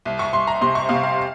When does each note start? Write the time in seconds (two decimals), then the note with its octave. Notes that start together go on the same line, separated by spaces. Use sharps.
0.05 C2
0.19 C#6
0.33 C2 C6
0.47 A#5
0.61 C3 C6
0.75 C#6
0.89 C3 F5
1.03 F5